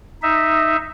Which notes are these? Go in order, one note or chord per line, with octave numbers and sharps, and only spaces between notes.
D#4 E5